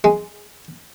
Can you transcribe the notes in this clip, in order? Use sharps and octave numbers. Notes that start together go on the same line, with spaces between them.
G#3